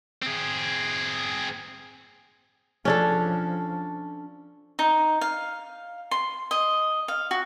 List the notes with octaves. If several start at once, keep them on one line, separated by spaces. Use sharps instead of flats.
C4 G#4
F3 C#4 D4 A4
D#4
F5
C6
D#5
F5
F#4